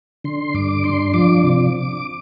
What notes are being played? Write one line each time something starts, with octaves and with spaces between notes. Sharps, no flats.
D3 C6
G2 D6
D4 C6
F3 D6
C3